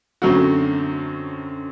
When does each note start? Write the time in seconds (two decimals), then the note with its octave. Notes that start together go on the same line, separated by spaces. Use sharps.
0.22 F#2 D3 F#3 A3 C4 F#4